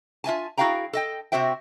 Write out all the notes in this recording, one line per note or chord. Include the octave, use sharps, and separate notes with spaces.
F4 E5 G#5 A5
E4 F#4 G#4 F5 G5 A#5
A4 D#5 G5
C3 C4 F#4 C5 E5 G5